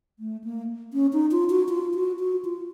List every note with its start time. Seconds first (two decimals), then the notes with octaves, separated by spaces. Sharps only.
0.19 A3
0.44 A#3
0.93 C#4
1.13 D#4
1.31 F4
1.50 F#4
1.69 F4
1.94 F#4
2.19 F#4
2.45 F4